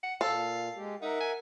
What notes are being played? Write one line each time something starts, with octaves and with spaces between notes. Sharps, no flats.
F#5
A#2 A4 F5
G#3 G4
D#4 A#4 E5 F#5
G#5